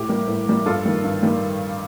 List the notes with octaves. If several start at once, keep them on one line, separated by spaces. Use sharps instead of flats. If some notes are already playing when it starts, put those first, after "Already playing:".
Already playing: A2 G4
G3 A#3
A2
G3 A#3
G2 F4 A4
D#3 G3
G2
D#3 G3